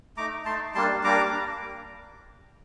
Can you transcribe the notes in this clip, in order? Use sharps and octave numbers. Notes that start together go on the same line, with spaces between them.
A3 D#4 A#5 D6
A3 D#4 A5 C6
G3 A#3 D4 A5 C6
G3 A#3 D4 A#5 D6